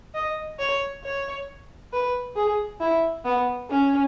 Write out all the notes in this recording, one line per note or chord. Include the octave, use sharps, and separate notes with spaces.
D#5
C#5
C#5
B4
G#4
E4
B3
C#4